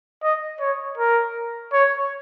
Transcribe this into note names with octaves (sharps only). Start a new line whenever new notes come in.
D#5
C#5
A#4
C#5